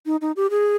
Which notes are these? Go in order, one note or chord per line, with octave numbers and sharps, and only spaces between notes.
D#4
D#4
G4
G#4